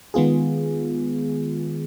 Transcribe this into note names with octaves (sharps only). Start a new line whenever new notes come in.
D#3 G#3 B3 F4 G#4